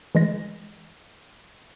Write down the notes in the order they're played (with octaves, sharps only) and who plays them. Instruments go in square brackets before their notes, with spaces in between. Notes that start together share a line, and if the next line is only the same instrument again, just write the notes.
[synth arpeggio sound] E3 G#3 A#6